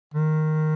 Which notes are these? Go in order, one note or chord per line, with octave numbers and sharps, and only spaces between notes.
D#3